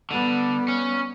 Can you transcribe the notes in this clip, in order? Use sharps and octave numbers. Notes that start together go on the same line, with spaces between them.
D3 G3 B3
C#4